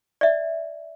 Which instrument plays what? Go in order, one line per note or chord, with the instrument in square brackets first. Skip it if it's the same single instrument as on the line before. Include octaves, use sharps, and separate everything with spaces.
[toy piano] D5 E5